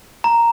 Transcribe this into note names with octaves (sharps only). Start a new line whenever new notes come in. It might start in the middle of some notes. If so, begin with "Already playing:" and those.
A#5